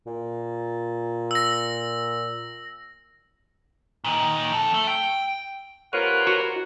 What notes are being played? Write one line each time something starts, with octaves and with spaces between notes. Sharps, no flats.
A#2
E6 A#6
A#2 D#3
F2 A4
A3
G5
C3 F4 A#4 B4 C#5 F#5
F#4